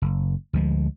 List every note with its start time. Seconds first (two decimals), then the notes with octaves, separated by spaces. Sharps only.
0.02 F#1
0.53 D2 F3 G#3